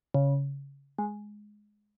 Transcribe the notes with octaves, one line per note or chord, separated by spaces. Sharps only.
C#3
G#3